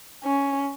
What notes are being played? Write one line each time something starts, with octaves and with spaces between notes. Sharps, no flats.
C#4